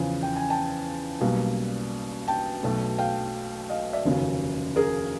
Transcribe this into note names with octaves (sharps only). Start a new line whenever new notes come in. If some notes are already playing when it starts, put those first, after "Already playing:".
Already playing: E2 C#3 F3
G5
G#5
G5 A5
B1 B2 G3 A#3
G5 A5
B1 B2 F#3 A3
F5 G5
D#5 F5
D5 E5
F1 D#2 C#3 F#3
G#4 A#4